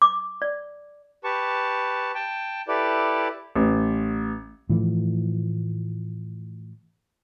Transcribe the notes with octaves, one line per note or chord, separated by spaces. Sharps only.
D6
D5
G4 B4 A5 C#6
G5 A5
E4 G4 A4 B4 D5
A1
A2 E3 F3 A3